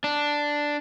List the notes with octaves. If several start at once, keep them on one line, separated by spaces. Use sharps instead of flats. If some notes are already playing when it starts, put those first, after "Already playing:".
D4